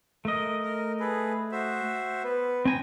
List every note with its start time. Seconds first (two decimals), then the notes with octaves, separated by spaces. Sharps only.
0.25 A3 A#4 D#5
0.62 A#4
1.00 G#4 A4 B4
1.52 F#4 C5 E5
2.24 B3 B4
2.65 C4 G5 G#5 A#5